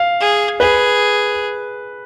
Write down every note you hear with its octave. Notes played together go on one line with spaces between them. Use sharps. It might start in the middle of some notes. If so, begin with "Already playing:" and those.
Already playing: F5
G#4
G#4 B4